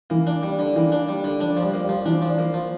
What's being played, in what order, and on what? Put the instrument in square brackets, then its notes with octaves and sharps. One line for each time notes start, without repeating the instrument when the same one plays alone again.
[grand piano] E3 [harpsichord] A#3
[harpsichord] D4
G3
D3
[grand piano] E3 [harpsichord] A#3
[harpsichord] D4
G3
D3
[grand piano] F3 [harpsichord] D4
[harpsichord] F3
[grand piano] G3
[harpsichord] A#3
[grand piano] G3
[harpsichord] F3
[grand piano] E3 [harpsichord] D4
[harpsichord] F3
A#3
F3